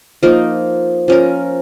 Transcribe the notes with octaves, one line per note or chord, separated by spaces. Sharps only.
F3 A#3 D#4 A#4
F3 C#4 A#4